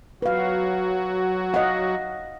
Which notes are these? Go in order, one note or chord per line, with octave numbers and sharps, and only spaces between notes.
F#3 F#4 B4 F5
D#5 F5 F#5